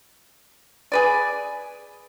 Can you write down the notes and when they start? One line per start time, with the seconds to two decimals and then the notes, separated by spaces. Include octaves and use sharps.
0.92 G#4 B4 D5